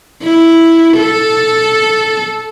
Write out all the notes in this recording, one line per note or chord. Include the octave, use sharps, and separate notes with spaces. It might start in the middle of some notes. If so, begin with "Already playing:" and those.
E4
A4